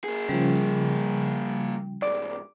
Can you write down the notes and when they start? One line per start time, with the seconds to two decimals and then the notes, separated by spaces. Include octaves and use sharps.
0.04 A#3 G#4
0.29 C#3 F3 G3
2.02 C2 G#2 D5 D6